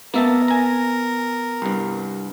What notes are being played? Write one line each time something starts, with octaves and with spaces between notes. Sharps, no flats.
A#3 B3 A#4 E5 A5
G#5 A#5
C2 G2